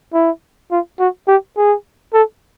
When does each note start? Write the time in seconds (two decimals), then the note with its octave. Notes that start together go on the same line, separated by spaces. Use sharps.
0.13 E4
0.71 F4
0.99 F#4
1.28 G4
1.57 G#4
2.14 A4